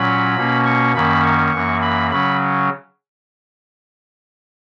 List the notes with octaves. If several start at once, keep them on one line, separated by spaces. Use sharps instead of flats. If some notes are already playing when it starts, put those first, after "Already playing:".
Already playing: A#2 F#3 C#4 B5
B2 A#3 C#4
C#6
F#2 D#3 A#3 C#4 B5
C#6
F#2 E3 A#3
B5
C#3 F#3 C#4 B5